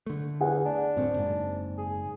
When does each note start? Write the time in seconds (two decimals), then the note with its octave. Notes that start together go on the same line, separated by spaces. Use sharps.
0.06 D3 A3
0.41 E2 G#4 F#5
0.66 D4
0.96 D1 A2 A3 C4
1.14 F#1 G#2
1.78 G#4